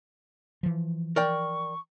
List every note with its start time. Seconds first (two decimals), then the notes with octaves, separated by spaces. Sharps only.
0.63 E3 F3
1.16 A#4 D5 G5 C#6